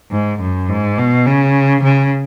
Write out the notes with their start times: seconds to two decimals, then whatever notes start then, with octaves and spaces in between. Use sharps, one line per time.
0.11 G#2
0.40 F#2
0.69 G#2
0.98 B2
1.26 C#3
1.84 C#3